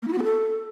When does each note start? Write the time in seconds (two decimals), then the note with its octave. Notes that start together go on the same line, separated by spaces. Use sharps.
0.02 A#3
0.08 E4
0.13 F#4
0.18 B3
0.23 A4